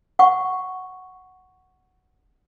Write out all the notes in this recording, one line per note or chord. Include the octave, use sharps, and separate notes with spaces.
F#5 C#6